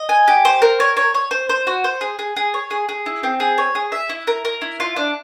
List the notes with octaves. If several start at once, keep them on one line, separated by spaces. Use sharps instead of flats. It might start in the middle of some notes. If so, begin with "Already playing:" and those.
Already playing: D#5
G#5
G4
C5
A#4
C#5
C#5
C#5
C5
C5
F#4
C5
G#4
G#4
G#4
C#5
G#4
G#4
E4
C4
G#4
C#5
G#4
E5
E4
A#4
A#4
E4
F4
D4